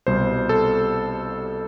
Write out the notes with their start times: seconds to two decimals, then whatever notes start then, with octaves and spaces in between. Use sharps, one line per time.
0.07 C2 B2 G3 C5
0.49 A4